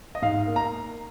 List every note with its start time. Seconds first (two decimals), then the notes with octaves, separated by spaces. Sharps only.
0.15 D#5
0.22 G#2 F5
0.47 A#3
0.56 A#5